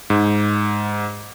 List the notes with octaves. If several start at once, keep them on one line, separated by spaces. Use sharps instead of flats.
G#2